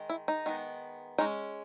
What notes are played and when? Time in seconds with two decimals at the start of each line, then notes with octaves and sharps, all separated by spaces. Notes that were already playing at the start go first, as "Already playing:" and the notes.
Already playing: D#3 G#3
0.10 E4
0.28 D#4
0.46 D#3 G#3 B3
1.18 G#3 C#4 D#4